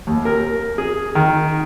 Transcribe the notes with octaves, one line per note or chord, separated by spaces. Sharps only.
D#2
A#4
G#4
D#3